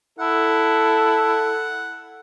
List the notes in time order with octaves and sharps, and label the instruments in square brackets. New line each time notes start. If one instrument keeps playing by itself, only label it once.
[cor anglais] E4 [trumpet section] A4 [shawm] F#5